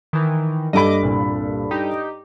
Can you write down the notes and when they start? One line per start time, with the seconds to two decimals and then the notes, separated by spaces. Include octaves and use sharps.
0.13 D#3 E3
0.73 G2 A4 D#5 B5 D6
1.03 C2 A#2
1.71 D#4 G4